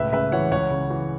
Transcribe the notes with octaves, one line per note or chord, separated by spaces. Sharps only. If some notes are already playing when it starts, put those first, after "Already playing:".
Already playing: C#2 A2 B4 E5
C#3 B4 E5
E3 C#5 F#5
C#2 C#5 F#5
C#3
E3